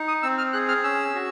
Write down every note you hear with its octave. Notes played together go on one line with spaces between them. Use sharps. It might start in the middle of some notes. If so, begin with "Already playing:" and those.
Already playing: D#4
D#6
C4 E6
F6
G#4 F#6
F6
C#4 E6
F#4